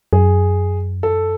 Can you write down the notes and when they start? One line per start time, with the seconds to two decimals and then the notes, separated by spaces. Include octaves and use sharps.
0.13 F#2 G#4
1.03 A4